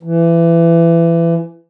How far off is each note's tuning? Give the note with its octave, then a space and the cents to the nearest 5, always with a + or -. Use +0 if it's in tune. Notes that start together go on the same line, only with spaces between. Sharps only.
E3 +25